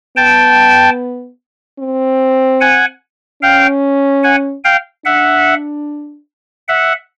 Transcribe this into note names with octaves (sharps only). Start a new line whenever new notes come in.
B3 G5 A5
C4
F#5 G#5
C#4 F5 G5
F#5 G#5
F5 G5
D4 E5 F#5
E5 F#5